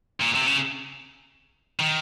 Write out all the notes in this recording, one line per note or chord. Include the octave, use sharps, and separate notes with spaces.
A#2
C3
C#3
D#3